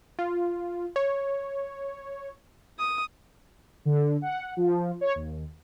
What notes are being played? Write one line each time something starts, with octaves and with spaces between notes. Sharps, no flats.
F4
C#5
D#6
D3
F#5
F3
C#5
D#2